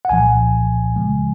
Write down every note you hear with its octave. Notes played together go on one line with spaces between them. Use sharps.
F#5
C2 A#2 F3 G#5
C#2 C#3 F3 G#3